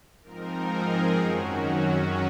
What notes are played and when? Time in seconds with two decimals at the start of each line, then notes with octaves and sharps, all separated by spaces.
0.23 G#2 F3 C4 D#4 A#4
0.71 G#4
1.18 F#2 D#3 F#3 C#4 F#4
1.65 F#4